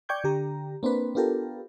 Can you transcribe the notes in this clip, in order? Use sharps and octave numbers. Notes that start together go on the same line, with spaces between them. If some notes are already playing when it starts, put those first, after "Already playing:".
D5 G5 C#6 D6 G6 G#6
D3 G4 A#5
A#3 C4 D4 B4
B3 D4 F4 G4 A4 A#4